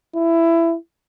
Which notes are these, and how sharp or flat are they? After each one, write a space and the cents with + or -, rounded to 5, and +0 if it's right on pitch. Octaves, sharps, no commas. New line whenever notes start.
E4 +15